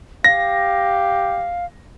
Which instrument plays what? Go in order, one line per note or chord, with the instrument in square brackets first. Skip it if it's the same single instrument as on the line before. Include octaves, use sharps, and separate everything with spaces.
[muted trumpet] G4 [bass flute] F5 [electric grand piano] A#6